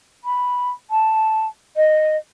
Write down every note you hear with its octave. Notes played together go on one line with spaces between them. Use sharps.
B5
A5
D#5